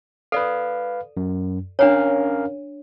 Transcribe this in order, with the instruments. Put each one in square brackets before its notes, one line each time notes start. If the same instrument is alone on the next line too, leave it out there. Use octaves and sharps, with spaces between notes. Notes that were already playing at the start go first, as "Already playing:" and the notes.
[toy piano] A4 D5 [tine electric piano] B4 F5
[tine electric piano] F#2
[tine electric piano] C#4 A#4 F5 [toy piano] D4 C#5